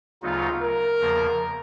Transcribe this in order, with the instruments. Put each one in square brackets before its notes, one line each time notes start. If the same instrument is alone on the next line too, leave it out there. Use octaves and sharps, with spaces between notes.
[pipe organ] D2 C#3 F#3 B3 D#4 [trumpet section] F4
[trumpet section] A#4
[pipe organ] E2 C#3 F3 A#3